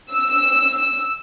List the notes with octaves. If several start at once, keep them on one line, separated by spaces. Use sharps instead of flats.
E6